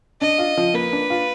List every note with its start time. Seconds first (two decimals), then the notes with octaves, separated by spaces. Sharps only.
0.21 D4 D#5
0.38 F4
0.57 F3
0.74 A#3 B4
0.93 D4
1.10 F4